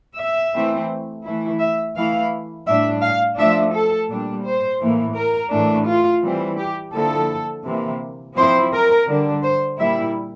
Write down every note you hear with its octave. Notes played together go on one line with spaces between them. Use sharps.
E5
E3 A3 C4
E3 A3 E4
E5
E3 A3 E4 F5
A2 G3 D4 E5
F5
F3 A3 D4 E5
A4
A#2 G3 D4
C5
A2 E3 A#3
A#4
A2 E3 A3 D4
F4
E3 G3 C4
G4
D3 F3 A#3 E4 A4
C3 E3 A#3
F3 C4 E4 C5
A#4
D3 G3 D4
C5
A#2 G3 A#3 E4 E5